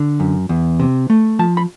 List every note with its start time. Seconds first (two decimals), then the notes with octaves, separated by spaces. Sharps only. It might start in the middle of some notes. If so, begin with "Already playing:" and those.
Already playing: D3
0.20 F#2
0.49 E2
0.80 C3
1.10 A3
1.39 F3 A5
1.57 B5